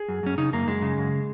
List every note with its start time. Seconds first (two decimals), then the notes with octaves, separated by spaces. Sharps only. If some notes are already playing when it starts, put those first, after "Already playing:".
Already playing: G#4
0.08 F#2
0.23 F#2 C#4
0.38 C#3 D#4
0.53 F#2 A#3
0.67 F#2 G#3
0.82 C#3
0.97 F#2